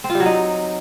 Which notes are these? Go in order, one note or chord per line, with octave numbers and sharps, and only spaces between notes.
C4
F4
G3
F#3
D#4